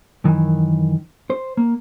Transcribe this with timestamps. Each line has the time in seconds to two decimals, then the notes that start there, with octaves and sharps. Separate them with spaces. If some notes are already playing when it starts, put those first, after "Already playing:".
0.24 F#2 D#3 E3
1.30 C5
1.57 A#3